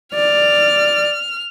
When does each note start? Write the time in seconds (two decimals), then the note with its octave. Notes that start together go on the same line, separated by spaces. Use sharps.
0.15 D5 F6